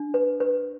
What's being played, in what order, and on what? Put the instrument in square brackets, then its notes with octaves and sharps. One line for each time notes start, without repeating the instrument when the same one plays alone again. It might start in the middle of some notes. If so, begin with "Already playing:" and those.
Already playing: [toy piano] D4
B4
B4